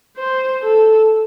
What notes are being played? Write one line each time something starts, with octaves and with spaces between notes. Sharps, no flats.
C5
A4